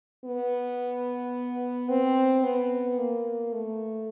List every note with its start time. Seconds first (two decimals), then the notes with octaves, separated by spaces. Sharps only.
0.25 B3
1.89 C4
2.44 B3
2.98 A#3
3.53 A3